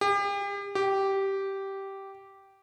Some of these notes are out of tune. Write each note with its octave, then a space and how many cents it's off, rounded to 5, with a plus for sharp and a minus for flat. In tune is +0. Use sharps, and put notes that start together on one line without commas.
G4 +40
G4 -10